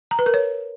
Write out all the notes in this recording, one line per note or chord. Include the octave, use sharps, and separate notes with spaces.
A#5
B4
A#4
C#5